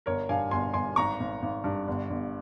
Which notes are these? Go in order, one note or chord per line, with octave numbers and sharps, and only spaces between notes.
G1 A#4 C#5
G2 F5 G#5
G1 G#5 C6
G1 G#5 C6
G#1 A#5 C#6
G#1
G#1
G2
G1
G1